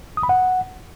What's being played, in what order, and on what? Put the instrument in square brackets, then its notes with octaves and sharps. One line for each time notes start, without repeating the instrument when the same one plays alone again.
[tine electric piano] D#6
B5
F#5